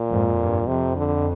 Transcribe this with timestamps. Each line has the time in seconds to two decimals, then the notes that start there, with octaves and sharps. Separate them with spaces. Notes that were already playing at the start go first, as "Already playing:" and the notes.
Already playing: A#2
0.09 F2 G#2
0.39 G2
0.67 F2 C3
0.96 D3